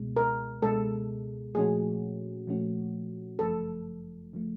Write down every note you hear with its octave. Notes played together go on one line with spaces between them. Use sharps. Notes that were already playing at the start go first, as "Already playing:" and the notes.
Already playing: C#2 B2 G#3
A#4
C#2 B2 G#3 A4
A#2 F3 A3 C#4 F#4 G#4
A#2 F3 A3 C#4 F#4
G1 F#2 C#3 F3 A3 A4
C#3 F3 A3